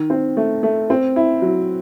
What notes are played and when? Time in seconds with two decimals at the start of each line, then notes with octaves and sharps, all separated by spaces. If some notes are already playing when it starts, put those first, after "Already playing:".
Already playing: D#3
0.10 C4
0.37 A3
0.63 A3
0.90 C4
1.16 E4
1.42 F#3